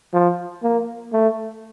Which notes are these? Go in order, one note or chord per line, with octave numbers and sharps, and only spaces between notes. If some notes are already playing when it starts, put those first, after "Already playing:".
F3
A#3
A3